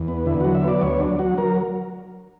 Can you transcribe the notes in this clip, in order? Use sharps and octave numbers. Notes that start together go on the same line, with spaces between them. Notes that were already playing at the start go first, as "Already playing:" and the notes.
Already playing: E2
B3
D3 E4
F#3 F#4
E5
B3 D5
D2 C#5
F#3 D4
F#3 F#4
F#3 A#4